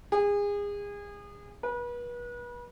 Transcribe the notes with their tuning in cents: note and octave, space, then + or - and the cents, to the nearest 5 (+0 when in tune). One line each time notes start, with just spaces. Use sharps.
G#4 -30
B4 -35